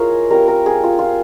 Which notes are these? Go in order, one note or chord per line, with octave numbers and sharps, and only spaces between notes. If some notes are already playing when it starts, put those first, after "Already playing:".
Already playing: G#3 E4 F4 G#4 A#4 C#5
G3 C4 F4 A#4
A#4
G#4
F4
F4